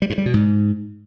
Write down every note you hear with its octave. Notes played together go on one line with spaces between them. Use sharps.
G3
G2
G3
B2
G#2